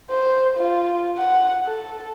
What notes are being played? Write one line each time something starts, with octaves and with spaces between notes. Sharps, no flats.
C5
F4
F#5
A4